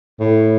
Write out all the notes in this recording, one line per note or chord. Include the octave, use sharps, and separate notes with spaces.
A2